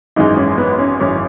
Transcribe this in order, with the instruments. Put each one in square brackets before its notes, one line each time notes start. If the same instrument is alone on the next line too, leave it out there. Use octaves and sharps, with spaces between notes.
[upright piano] G#1 F#2 E3 G#3 [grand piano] D#4
[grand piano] C#4
B3
C#4
[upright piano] G#1 F#2 E3 G#3 [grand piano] C#4